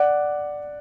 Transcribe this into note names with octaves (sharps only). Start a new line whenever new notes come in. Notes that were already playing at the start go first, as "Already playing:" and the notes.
Already playing: D5 F#5